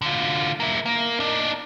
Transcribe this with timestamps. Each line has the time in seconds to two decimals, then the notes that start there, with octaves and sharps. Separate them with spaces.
0.02 D3 F4
0.60 A#3 E4
0.86 A#3
1.20 D4 D#4